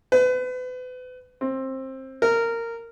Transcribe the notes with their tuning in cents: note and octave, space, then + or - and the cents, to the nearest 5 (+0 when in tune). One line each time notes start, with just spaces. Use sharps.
B4 +35
C4 +20
A#4 -15